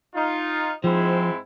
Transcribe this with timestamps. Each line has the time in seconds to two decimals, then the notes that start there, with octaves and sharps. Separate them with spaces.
0.15 D#4 F4
0.84 G#2 F3 C4 E4